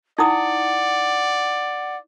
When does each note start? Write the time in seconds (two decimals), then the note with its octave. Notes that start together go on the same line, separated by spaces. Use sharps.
0.18 D#4 E4 D5 F#5 D#6